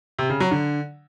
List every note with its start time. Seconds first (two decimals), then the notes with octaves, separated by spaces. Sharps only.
0.19 C3
0.29 C#3
0.40 F#3
0.51 D3